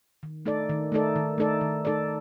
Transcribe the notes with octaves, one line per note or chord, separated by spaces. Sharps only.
D#3
A3 D#4 A4 D5
D#3
A3 D#4 A4 D5
D#3
A3 D#4 A4 D5
D#3
A3 D#4 A4 D5